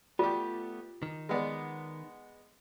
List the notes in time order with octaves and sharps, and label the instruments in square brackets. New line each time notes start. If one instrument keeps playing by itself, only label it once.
[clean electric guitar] A3 B3 [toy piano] F4 [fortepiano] G4 D5
[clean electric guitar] D#3
[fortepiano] G#3 B3 D5